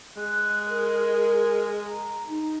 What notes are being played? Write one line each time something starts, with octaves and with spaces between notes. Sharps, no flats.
G#3 F#6
A#4
A#5
D#4